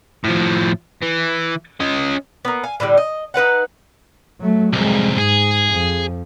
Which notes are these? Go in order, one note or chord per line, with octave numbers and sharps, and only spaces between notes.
A2 F3
E3
C#4 D#5
A#3 B3
F5 G#5
A2 D3 E3 G3
D#5
D#4 B4 F5 F#5
F#3 A3
C2 F2 G#3
G#2 G#4
F2